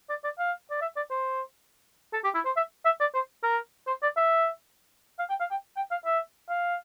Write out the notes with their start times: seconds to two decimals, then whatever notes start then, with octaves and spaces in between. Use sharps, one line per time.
0.09 D5
0.24 D5
0.39 F5
0.71 D5
0.81 E5
0.96 D5
1.10 C5
2.13 A4
2.24 G4
2.34 E4
2.45 C5
2.56 E5
2.85 E5
3.00 D5
3.15 C5
3.43 A#4
3.87 C5
4.02 D5
4.17 E5
5.19 F5
5.29 G5
5.40 F5
5.51 G5
5.76 G5
5.91 F5
6.05 E5
6.49 F5